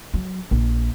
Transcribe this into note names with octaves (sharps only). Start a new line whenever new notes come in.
F#3
A#1